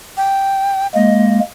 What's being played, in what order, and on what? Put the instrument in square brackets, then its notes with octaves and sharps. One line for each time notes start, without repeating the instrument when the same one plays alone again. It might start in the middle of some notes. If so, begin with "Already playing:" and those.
[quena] G5
[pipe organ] G#3 A#3 [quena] D#5